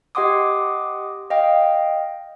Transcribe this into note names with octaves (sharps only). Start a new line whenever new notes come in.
G4 D#5 F#5 C6 D6 D#6
D#5 F5 G5